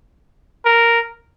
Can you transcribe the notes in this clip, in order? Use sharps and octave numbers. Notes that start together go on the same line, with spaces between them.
A#4